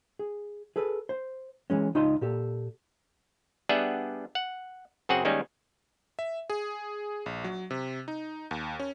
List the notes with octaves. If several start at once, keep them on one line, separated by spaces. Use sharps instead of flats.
G#4
G#4 A4 B4
C5
E3 F#3 G#3 C#4
C#2 D#4 F4 D#5 A5 C6
A#2 G4 A4
G3 B3 D4 G#4 E5 F#5
F#5
F#2 C#3 C4 F#4 G#4 F#5
D#3 G3 G#3 A#3 C#4
E5
G#4
A#1
F#3
C3
D#4
D#2
C#4